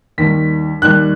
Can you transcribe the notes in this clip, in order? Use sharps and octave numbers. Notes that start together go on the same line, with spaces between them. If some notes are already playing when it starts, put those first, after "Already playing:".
D#2 D#3 G3 B6
D#2 D#3 G3 F#6